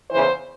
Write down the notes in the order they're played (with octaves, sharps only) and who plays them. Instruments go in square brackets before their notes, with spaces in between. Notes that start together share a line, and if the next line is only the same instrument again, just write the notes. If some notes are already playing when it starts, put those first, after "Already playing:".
[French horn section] E2 C#3 E3 C5